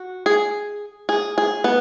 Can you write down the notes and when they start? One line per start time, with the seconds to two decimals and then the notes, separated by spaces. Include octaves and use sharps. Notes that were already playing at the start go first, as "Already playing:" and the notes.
Already playing: F#4
0.26 G#4
1.09 G#4
1.38 G#4
1.64 B3